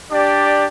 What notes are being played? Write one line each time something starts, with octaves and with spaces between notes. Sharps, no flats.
D4 G4 D5